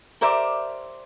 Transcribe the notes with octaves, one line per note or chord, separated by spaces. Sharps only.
G4 A#4 C5 D5 E5